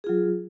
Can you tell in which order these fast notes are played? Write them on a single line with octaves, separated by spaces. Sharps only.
G#4 F4 F#3